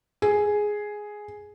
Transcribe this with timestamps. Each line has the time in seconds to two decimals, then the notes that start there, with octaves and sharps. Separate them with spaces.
0.22 G#4